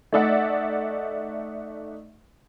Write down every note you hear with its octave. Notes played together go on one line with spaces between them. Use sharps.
A3 D#4 D5 E5 F#5